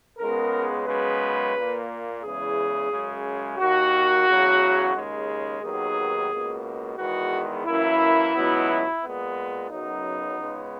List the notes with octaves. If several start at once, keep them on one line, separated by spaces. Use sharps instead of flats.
C#2 C#3 G#3 B3 A#4
F#2 C#3 G#3 B3 B4
A#2 A#3
E2 C#3 E3 G#3 G#4
F#2 C#3 G#3
D#2 D#3 A#3 F#4
E2 C#3 F#3
D#2 C#3 G#3
D#2 D#3 F#3 B3 G#4
C#2 B2 A#3
E2 D#3 G#3 B3 F#4
F#2 E3 A#3 E4
C#2 B2 F#3 B3
A#2 G#3 B3
F#2 C#3 F#3 B3 D#4
C#2 C#3 G#3 B3